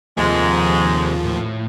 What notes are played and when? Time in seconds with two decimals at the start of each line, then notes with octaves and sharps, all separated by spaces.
0.17 D#2 G#2 C3 F3 G#3 A3
1.24 A2